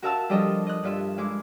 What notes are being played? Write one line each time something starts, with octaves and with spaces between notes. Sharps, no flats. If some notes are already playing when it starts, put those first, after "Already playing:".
F#4 A#4 E5 F5 A5 E6
F3 G3 D4 A4 A#4 D#5
D#5 F#6
G2 F4 E5
G#3 E4 D6